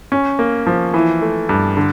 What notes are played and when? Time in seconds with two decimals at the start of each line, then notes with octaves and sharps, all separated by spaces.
0.12 C#4
0.39 A#3
0.67 F3
0.94 E3
1.21 A3
1.49 G2
1.77 D3